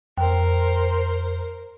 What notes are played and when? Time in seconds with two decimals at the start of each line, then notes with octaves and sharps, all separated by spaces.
0.17 F2 A#4 C5 G5